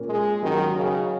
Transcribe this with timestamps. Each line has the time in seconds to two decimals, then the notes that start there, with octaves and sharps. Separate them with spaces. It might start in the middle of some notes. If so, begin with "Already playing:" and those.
Already playing: A#2 A#3 C#4
0.10 G#3
0.43 D#3 F#3 C#4 F#4 A#4
0.76 C#3